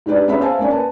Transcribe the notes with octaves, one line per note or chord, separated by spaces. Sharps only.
G#2 D4 G4 B4 D5
B3 C#4 G#4 E5 B5
C5 E5 F5 G#5 A5
A#3 C#4 D5 G#5
B4 A5